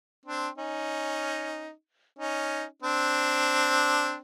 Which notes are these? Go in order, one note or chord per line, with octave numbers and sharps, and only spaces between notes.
C4 D4
C#4 D#4
C#4 D#4
C4 D4